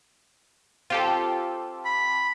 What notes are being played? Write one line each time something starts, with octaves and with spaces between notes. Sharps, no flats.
C4 F4 G4 A4
B5